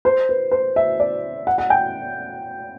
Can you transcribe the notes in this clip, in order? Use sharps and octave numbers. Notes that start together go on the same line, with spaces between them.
C5
B4
C5
E5
D5
F#5
F#5
G5